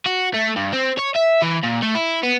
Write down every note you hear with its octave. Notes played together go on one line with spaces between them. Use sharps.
F#4
A3
G2
C4
C#5
E5
E3
A#2
A3
E4
B3